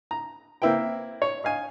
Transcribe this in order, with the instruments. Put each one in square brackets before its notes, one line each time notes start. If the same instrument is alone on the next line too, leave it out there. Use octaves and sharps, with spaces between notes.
[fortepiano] A#5
A#3 C4 E4 B4 G5
C#5
D#5 F5 G#5